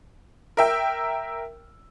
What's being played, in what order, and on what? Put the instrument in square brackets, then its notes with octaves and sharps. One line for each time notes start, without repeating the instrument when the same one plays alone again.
[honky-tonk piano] A#4 E5 G5